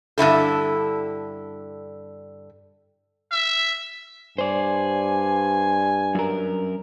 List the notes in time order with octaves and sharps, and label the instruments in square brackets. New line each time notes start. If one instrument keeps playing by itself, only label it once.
[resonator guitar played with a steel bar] G2 D3 E4 A4
[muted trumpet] E5
[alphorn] G2 [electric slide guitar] C5 D5 [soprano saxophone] G#5
[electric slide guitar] F#2 A#4